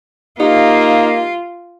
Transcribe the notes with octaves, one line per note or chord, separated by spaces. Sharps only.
A#3 D#4 F4 G4